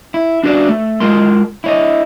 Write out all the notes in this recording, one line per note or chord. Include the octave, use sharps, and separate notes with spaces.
E4
D4 F#4 B4 D5
A3
G#3 F4 A#4 C6
E4 C#5 D#5